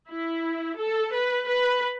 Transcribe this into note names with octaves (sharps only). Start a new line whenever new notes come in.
E4
A4
B4
B4